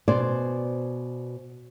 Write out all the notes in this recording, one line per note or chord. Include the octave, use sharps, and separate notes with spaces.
B2 C5 D5 G#5